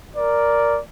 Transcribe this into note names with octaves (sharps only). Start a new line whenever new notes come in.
A#4 D5